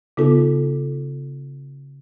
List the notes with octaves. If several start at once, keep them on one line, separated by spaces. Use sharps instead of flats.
C#3 B3 D#4 F4 A4